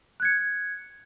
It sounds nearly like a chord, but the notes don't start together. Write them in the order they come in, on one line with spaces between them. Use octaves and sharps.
F#6 G#6 C#7